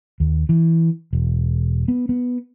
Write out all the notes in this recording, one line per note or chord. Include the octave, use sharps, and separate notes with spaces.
D#2
E3
E1
B3
B3